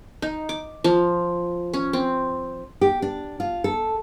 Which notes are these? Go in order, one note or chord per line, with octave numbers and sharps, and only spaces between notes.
D#4
D6
F3
C#4
C4
G4
D4
F4
A4